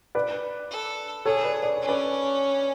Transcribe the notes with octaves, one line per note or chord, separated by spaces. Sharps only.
B4 D5
A4
G#4 A4 C#5
B4 D5
D5
C#5
C#4
B4 D5